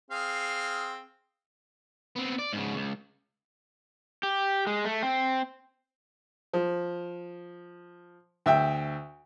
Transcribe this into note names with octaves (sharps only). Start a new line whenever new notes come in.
C4 G#4 F5
B3 C4
D5
G#2 C#3
C#2
G4
G#3
A3
C4
F3
D2 E5 G5